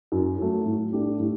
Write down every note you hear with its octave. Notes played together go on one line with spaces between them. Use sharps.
F#2
F#3 A3
A2
A3 D4 G4
A2